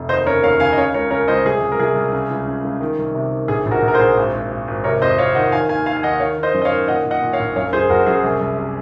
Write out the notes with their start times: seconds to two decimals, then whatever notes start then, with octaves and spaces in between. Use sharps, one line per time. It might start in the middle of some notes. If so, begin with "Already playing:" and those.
Already playing: F1
0.09 D#2 C5 D#5
0.26 C#3 A#4 C#5
0.43 D#2 C#5 F5
0.60 C#3 F5 G#5
0.73 D#5
0.77 C#3 C#5 F5
0.94 C#2 A#4 C#5
1.11 C#3 A#4 C#5
1.28 C#2 C5 D#5
1.45 C2 G#4
1.62 C2
1.72 A#4
1.79 C2 G#4
1.96 C2
2.13 C#3
2.30 C#2
2.48 C#3
2.64 C#2
2.81 D#3
2.98 C2
3.15 C3
3.32 D#3
3.48 A#1 G#4
3.66 A#1
3.71 F#4 A#4
3.83 A#1
3.88 A#4
3.94 G#4 C5
4.00 A#1
4.17 G#1
4.34 G#1
4.51 G#1
4.68 G#1
4.84 C3 A#4 C#5
5.02 F2 C5 D#5
5.18 F2 C#5 F5
5.35 D#3 D#5 F#5
5.52 D#3 F5 G#5
5.69 D#2 F5 G#5
5.86 D#2 F5 G#5
5.97 G#5
6.03 D#2 D#5 F#5
6.20 D#3 C#5 F5
6.38 D#3
6.43 C5 D#5
6.54 F#2
6.62 D#5
6.65 C#5 F5
6.71 D#3
6.88 A#2 D#5 F#5
7.05 A#2
7.11 D#5 F#5
7.22 A#2
7.33 C#5 F5
7.40 A#1
7.56 F#2 C#5 F5
7.73 F#1 G#4 C5
7.90 F#1 F#4 A#4
8.07 F#2 G#4
8.24 C2
8.41 C2
8.58 C3